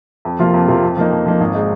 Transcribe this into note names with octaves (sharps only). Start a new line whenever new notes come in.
F2
C3 F3 A#3 F4
F2
C3 F3 A#3 F4
F2
F3 A#3 D#4
F2
F3 A#3 D#4
G#1
G#3 D#4